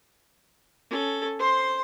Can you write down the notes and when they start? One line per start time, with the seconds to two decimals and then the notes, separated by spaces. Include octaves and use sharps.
0.90 C#4 A4
1.39 C5 C6